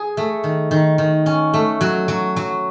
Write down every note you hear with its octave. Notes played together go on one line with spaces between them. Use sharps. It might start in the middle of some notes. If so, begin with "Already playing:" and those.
Already playing: G#4
A3
D#3
D#3
D#3
C#4
A3
F#3
F#3
F#3